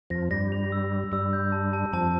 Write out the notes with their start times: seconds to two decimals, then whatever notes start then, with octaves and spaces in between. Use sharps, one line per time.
0.10 F2 F3 A#6
0.31 G2 G3 A#6
0.52 F7
0.72 E6
0.92 E6
1.12 G2 G3 E6
1.33 G6
1.52 A5
1.73 A5
1.93 F2 F3 A5